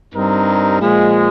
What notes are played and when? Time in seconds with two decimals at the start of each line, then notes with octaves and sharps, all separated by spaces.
0.14 G2 G3 C4 D#4 A#4
0.80 A#2 F3 G#3